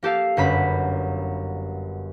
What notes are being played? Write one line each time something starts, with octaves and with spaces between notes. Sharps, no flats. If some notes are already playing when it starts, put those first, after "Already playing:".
A#3 G4 A4 F5
G1 F#2 B5 B6